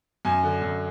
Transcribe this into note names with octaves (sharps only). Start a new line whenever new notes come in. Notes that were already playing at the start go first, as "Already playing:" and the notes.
F#2 G#5
D3
F#2